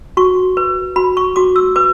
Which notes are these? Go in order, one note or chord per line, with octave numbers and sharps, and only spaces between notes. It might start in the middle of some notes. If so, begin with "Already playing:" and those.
F#4 C#6
B4
F#4 B5
C#6
F#4 D6
E6
B4 D6